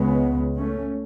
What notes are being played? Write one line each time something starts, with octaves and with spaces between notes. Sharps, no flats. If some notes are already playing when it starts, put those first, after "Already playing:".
Already playing: C#2 C#3 G#3 B3
A3 C#4